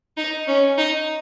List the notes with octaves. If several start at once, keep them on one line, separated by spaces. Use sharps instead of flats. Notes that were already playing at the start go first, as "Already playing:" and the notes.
D#4
C#4
D#4